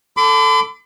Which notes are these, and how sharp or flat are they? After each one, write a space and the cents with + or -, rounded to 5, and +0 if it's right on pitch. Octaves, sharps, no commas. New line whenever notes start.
A4 +5 B5 +45 D6 -10